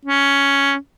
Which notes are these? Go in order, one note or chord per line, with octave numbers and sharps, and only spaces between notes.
C#4